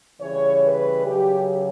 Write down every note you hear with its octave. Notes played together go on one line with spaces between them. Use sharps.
C#3 E3 G3 C#5
B4
C#3 F#3 G4